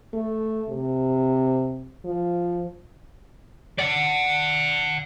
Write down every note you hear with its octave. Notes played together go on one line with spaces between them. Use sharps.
A3
C3
F3
D5 F#5